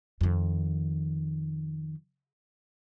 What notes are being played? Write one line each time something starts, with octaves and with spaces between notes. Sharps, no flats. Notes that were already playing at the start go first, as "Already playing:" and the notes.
F2 D#3